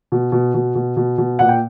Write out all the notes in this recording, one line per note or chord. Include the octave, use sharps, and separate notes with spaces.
B2
B2
B2
B2
B2
B2
A#2 F#5
G5